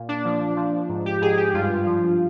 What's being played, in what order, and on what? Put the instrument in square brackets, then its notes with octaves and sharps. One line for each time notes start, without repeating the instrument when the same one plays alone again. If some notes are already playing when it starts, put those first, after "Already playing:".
Already playing: [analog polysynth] A#2
D4
F3
F3
G#2
G4
G#2 G#4
G4
G2 F4
F3